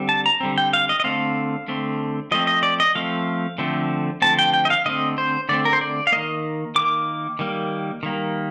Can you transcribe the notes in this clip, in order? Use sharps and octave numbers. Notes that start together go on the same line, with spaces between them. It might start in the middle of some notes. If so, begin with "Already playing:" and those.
Already playing: D3 G3 C4
A5
A#5
D3 G3 C4
G5
F5
D#5
D#5
D3 A3 C4 F5
D3 A3 C4
F3 A3 C4 D#5
D#5
D5
D#5
F3 A3 C4 F5
D3 F3 A3 C4
D3 F3 A3 C4 A5
G5
G5
D#5
F5
D3 A3 C4 D#5
C5
D3 A3 C4 D5
A#4
C5
D5
F5
D#3 A#3 D#5
D#3 A#3 D6
D#3 G3 A#3
D#3 G3 A#3